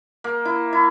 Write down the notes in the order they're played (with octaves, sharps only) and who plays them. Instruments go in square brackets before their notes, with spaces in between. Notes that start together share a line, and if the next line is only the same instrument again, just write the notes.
[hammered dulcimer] A#3
E4
E4